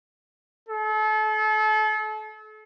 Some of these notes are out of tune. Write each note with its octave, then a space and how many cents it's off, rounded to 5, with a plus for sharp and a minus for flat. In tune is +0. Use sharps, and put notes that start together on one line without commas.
A4 -35